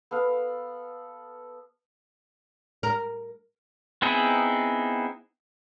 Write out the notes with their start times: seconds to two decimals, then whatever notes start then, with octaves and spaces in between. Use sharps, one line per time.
0.11 B3 A4 F5
2.83 A#4
4.02 B3 C4 D#4 E4 G#4